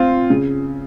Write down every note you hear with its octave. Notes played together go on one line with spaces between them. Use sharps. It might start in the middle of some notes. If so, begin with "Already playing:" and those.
Already playing: C4 F4
C#3